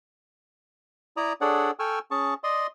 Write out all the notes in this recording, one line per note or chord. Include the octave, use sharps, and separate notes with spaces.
E4 D5 A#5 D#6
D4 G#4 A4 C#5 D5 F#5
A4 G5 G#5 C#6 E6 F6
C#4 G#4 A5 C#6
D5 D#5 C6 D#6